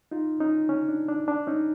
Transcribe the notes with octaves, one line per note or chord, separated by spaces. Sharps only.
D#4 F4
C#4 D#4
C#4
D4
D4
D4
C#4 D#4